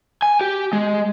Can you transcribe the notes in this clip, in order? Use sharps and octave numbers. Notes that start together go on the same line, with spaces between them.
G#5
G4
G#3